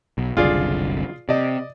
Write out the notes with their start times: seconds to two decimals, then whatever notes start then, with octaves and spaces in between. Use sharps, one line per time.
0.18 B1
0.37 F#1 C2 D3 F4 G#4 D5
1.29 C3 D5 D#5